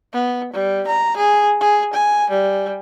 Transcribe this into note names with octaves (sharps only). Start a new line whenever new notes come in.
B3
G3
A#5
G#4
G#4
G#5
G3